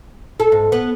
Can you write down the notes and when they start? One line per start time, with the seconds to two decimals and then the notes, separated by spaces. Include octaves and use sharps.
0.40 A4
0.52 G#2
0.72 B3